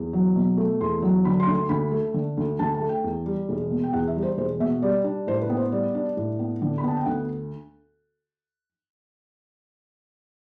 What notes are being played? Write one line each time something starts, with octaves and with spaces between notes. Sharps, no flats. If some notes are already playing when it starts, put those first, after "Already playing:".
Already playing: E2
F#3
B2
A3
E2 C6
F#3
D3 B5
C6
D2
C6
D2 B5
A3
D3
D2
D2 A5
A5
A3
G5
E2
G3
E1
B2
G5
E2 F#5
E5
G3
C5
E1 C5
B2 E5
G3 D5
D4
A2 C5
B4
B3
C5
G3 D5
D4
A2
B3
D3
B5
B3 A5
G5
D2 F#5